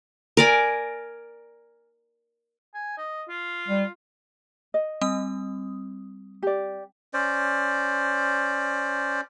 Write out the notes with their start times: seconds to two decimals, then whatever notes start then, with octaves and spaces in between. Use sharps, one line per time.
0.37 A#4 D5 G#5
2.74 G#5
2.98 D#5
3.29 F4
3.68 G3
4.74 D#5
5.01 G3 C4 D#6
6.43 G4 D5
7.14 C#4 C5 D5